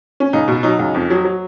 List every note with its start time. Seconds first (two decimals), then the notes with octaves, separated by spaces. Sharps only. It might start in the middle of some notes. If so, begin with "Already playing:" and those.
0.20 C#4
0.33 C#2 D#4
0.48 B2
0.63 F#3 D#4
0.79 C#2
0.94 F2
1.10 F#3
1.25 F#3